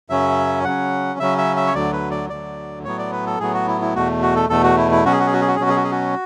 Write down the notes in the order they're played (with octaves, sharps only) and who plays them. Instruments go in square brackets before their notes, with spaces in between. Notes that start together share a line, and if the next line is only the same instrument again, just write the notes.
[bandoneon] F#2 C#3 F#3 C#4 E5
C#3 F#3 C#4 F#5
C#3 F#3 C#4 E5
E5
E5
C#5
D2 D3 F#3 D5
B4
D5
D2 D3 F#3 D5
A2 F#3 B3 C#5
D5
B4
A4
A2 F#3 B3 G#4
F#4
E4
E4
E2 B2 A3 F#4
F#4
A4
E2 B2 A3 A4
F#4
E4
E4
B2 F#3 C#4 F#4
G#4
F#4
G#4
F#4
G#4
F#4
G#4
B2 F#3 C#4 F#4
G#4
F#4
G#4
F#4